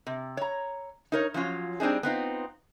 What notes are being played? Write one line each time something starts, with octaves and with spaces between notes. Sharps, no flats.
C3
C#5 A#5
D#4 A#4 C#5
F3 F#3 C#4 F4
G3 C4 D4 D#4 G#4
B3 C4 D#4 F4